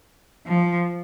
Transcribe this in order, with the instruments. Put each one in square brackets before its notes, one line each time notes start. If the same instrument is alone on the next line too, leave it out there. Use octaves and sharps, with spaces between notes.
[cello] F3